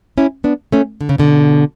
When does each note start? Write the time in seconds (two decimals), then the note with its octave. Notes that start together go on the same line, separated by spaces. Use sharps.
0.18 C#4 E4
0.44 B3 D4
0.72 A3 C#4
1.01 D3
1.09 C#3
1.18 B2 D3